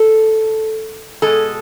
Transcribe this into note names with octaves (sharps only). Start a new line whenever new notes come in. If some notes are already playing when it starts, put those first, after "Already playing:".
Already playing: A4
B2 G#3 A4